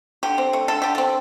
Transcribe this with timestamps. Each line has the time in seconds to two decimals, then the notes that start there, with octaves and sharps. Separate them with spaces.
0.23 D3 G4
0.38 C4
0.53 A3
0.68 D3 A4
0.82 D3 G4
0.95 C4 A4